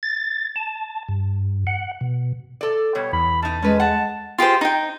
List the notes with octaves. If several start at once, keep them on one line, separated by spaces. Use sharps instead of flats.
A6
A5
G2
F#5
B2
A4 D5
B2 G3 C#5
E2 B5
B2 D#4 A5
G#3 C#4 B4
F#5 A5
F4 G4 G#4 C5
D#4 G5